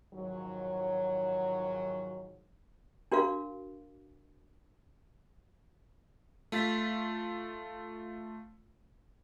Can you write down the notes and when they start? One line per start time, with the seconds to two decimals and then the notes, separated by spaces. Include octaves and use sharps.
0.13 F2 G#2 D#3 F#3
3.12 D4 F#4 A#4 F5
6.52 A3 F4 A6 B6